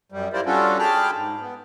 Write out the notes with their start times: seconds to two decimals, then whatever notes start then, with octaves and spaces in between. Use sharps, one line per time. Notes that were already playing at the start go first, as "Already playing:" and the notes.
0.12 F#2 G3
0.33 E4 F4 G4 A#4 C5 D5
0.46 G3 C#4 D4 F4 F#4 A4
0.79 G#4 G5 A5 B5 D6 F6
1.14 G#2
1.40 B3